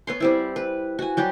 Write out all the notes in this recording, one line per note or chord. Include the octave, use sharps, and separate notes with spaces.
B3 C#5 C6
G3 C4 E4
B4
F#4 G#5
F#3 G3 G4